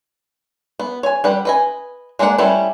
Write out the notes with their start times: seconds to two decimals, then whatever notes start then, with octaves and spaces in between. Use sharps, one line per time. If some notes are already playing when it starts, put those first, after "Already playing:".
0.79 B3
1.03 C#5 G#5
1.24 G3 B4 F#5
1.45 B4 D#5 G#5
2.19 G#3 A#3 D4 G#4 F#5
2.38 G3 A3 C#4 E4 A4